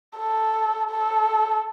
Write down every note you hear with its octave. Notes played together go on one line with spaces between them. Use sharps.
A4
A4